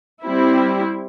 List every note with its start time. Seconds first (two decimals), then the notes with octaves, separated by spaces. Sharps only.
0.24 G3 C4 E4